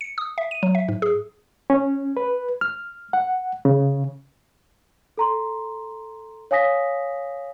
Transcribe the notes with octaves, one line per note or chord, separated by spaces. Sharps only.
C#7
D#6
E5
D#7
F#3
E5
G#2
G#4
C#4
B4
F6
F#5
C#3
A4 A#5 C6
C#5 F5 G#5 D#6 A#6 B6